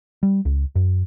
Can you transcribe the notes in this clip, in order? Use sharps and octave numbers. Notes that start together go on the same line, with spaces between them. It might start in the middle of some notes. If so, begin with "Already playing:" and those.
G3
C#2
F#2